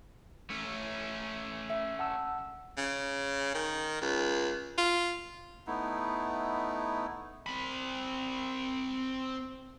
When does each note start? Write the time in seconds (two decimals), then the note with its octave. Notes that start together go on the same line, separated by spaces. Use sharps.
0.50 A3 C#4
1.70 E5
1.99 F#5 A5 E6
2.77 C#3
3.54 D#3
4.02 C#2
4.78 F4
5.67 A3 B3 D#4 E4
7.46 C4 B5